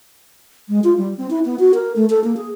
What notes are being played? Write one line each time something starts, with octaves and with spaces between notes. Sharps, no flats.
G#3
F4
G3
C4
E4
B3
F#4
A#4
A3
A4
A#3
G#4